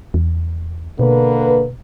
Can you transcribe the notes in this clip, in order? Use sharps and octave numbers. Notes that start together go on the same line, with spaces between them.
E2
B2 D3 A#3 B4